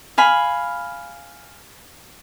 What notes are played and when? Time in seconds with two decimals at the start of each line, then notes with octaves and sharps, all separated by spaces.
0.18 F5 G#5 B5